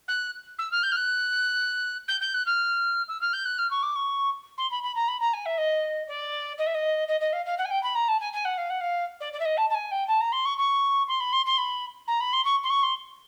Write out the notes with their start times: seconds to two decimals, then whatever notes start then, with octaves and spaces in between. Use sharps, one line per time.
0.07 F#6
0.58 E6
0.71 F6
0.83 G6
0.91 F6
0.96 F#6
2.07 G6
2.20 G6
2.33 F#6
2.45 F6
3.08 E6
3.21 F6
3.33 G6
3.45 F#6
3.58 F6
3.70 C#6
3.82 D6
3.95 C#6
4.57 C6
4.70 B5
4.83 B5
4.95 A#5
5.08 B5
5.20 A#5
5.33 G#5
5.45 E5
5.57 D#5
6.07 D5
6.58 D#5
6.66 E5
6.74 D#5
7.07 D#5
7.20 D#5
7.32 F5
7.45 F5
7.57 F#5
7.64 G#5
7.70 G5
7.83 B5
7.95 A#5
8.08 A5
8.20 G#5
8.32 G#5
8.44 F#5
8.57 F5
8.69 F#5
8.80 F5
9.20 D5
9.32 D5
9.39 E5
9.45 D#5
9.57 A5
9.69 A5
9.74 G#5
9.91 G5
10.07 A5
10.20 A#5
10.32 C6
10.45 C#6
10.57 C#6
11.07 C6
11.20 B5
11.32 C6
11.45 C6
11.57 B5
12.07 A#5
12.20 B5
12.32 C6
12.44 C#6
12.63 C6
12.69 C#6
12.82 C6